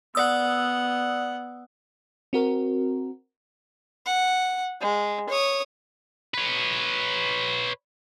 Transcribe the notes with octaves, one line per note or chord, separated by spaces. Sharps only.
B3 D5 F#5 D#6 E6
C4 F#4 A#4
F#5
G#3
C#5 D#6
B4 C#5